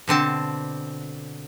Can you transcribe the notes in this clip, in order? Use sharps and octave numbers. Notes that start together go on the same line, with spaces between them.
B2 D3 C4 A5